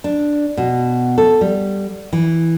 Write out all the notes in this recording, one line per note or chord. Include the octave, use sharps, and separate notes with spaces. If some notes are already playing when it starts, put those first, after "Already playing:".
D4
B2
A4
G3
E3